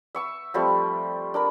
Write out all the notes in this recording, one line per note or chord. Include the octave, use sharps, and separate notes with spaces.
E5 C#6 E6
F3 G3 A3 C4
D4 A#4 B5